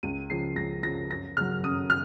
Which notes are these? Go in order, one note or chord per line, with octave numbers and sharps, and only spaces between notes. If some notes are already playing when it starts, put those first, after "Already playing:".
C#2 D#7
C#3 F3 C7
C#2 A#6
C#3 F3 A#6
F#2 A#6
C#3 F#3 F6
F#2 D#6
F6